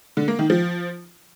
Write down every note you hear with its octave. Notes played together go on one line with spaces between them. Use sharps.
D3
A#3
D#3
F3